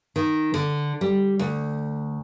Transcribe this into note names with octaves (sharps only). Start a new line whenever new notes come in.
D#3
D3
G3
D2